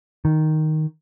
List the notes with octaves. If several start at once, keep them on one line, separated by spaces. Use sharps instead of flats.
D#3